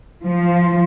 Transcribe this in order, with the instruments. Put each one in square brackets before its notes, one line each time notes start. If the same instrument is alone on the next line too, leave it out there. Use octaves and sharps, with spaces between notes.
[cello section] F3